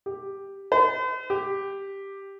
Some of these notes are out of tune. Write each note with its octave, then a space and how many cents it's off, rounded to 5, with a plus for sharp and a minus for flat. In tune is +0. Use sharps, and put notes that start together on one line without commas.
G4 +5
C5 -45
G4 +5